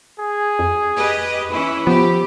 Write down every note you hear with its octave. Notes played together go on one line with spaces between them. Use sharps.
G#4
F2
G4 B4 D#5
E3 C#4 E4 B5
F3 B3 G4